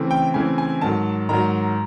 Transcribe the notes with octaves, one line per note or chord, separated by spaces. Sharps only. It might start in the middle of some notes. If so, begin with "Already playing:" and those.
Already playing: C#3 E3 A3 C4
G5
C#3 E3 A3 C4 G#5
G#5
G#2 D#3 F#3 A5
G#2 D#3 F#3 A#5